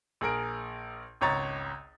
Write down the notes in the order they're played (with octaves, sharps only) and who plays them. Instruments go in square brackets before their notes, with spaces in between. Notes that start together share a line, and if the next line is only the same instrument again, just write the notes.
[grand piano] A#1 G#4 A#4 D7
G#1 C#2 C#5 A#5 A6